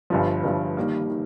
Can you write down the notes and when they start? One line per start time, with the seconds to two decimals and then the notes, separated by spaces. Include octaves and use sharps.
0.10 G1 G2 F3
0.43 G1 G2 F3
0.77 D#3 G3 A#3
1.10 D#3